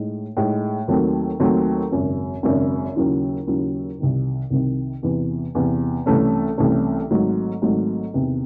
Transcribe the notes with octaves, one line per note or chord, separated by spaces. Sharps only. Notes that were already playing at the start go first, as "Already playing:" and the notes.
Already playing: A2 G#3 D#4
A2 G#3 D#4
D#2 D#3 F#3 A3 C4
D#2 D#3 F#3 A3 C4
G#1 F#2 C#3
G#1 F#2 C#3
D#2 C#3 F#3 C#4 E4
D#2 C#3 F#3 C#4 E4
C2 C3 D#3
C2 C3 D#3
E2 C3 E3
E2 C3 E3
C2 C3 E3 A3 C#4
C2 C3 E3 A3 C#4
G#1 G#2 F#3 A3
G#1 G#2 F#3 A3
E2 C3 D#3